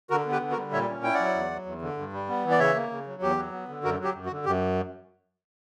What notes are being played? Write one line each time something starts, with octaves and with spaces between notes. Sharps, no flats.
D3 F#4 A#4
B3
G4 B4
D3
F#4 A#4
G3
A#2 C#5 E5
C#4
E4 G5
D5 F#5
F#3
E2
F#3
E2
D3
G2
G3
B3
E3
D5
C#3 C#5 E5
A#3
C#3
F#3
E2 G4
F#3
B3
D3
F#2 F#4 A#4
F#3 G4
F#2
F#4
D3
F#2 G4